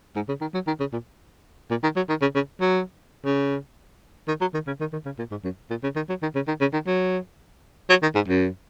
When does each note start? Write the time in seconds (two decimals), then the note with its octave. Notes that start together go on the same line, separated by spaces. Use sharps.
0.16 G#2
0.28 C#3
0.41 D#3
0.54 F#3
0.67 D#3
0.80 C#3
0.93 A#2
1.70 A#2
1.83 D#3
1.96 F#3
2.09 D#3
2.22 C#3
2.35 C#3
2.61 F#3
3.25 C#3
4.28 D#3
4.41 F#3
4.54 D#3
4.67 C#3
4.80 D#3
4.93 D#3
5.05 C#3
5.18 A#2
5.31 G#2
5.44 F#2
5.70 A#2
5.83 C#3
5.96 D#3
6.09 F#3
6.22 D#3
6.35 C#3
6.48 D#3
6.61 C#3
6.73 D#3
6.87 F#3
7.90 F#3
8.02 D#3
8.15 G#2
8.28 F#2